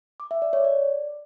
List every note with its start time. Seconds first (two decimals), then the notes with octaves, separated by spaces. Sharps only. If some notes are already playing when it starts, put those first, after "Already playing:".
0.20 D6
0.31 E5
0.42 D5
0.53 C#5
0.64 D5